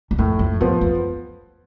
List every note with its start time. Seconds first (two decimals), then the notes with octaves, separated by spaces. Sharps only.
0.11 E2
0.18 F2 A2
0.39 F2
0.61 F2 F3 B3
0.81 F2